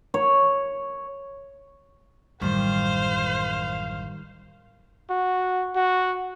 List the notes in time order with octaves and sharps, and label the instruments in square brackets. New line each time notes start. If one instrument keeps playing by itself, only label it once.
[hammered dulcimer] C#5
[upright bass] A1 F#2 [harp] D#3 G3 [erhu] C5 [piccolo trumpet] F5
[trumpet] F#4
F#4